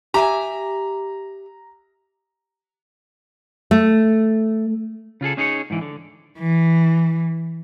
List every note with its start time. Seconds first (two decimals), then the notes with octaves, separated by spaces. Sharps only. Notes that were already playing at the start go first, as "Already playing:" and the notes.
0.14 G4 E5 G#5 A#5
3.71 A3
5.21 C#3 F4 G#4 A4
5.37 C#4 D#4 G#4 C5 C#5
5.70 G#2 E3
5.81 D3
6.38 E3